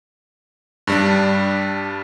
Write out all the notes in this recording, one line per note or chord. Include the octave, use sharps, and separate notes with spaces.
G2 G3 D4